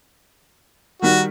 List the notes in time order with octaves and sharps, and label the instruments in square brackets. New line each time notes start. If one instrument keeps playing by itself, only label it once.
[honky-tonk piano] D#3 G3 [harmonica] F#4